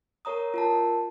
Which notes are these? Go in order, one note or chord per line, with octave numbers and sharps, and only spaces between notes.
A#4 C#5 A#5 D#6
F4 A#4 A5